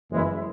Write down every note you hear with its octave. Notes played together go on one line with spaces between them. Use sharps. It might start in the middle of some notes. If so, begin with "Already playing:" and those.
F#1 F#2 E3 G#3 E4